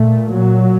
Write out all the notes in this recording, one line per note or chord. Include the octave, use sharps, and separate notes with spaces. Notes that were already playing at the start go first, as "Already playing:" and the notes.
Already playing: A#2 A3
F#3